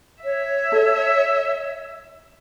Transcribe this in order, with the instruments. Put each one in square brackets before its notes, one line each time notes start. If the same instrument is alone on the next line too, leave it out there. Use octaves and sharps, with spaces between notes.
[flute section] C#5 [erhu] E5
[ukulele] A4